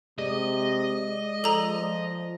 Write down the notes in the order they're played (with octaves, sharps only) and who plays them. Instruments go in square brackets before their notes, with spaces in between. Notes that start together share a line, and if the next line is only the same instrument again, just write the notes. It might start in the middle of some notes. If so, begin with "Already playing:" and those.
[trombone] C3 [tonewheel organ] G#3 D5 D#6 [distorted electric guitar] D#5
[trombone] F3 [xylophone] A4 A#5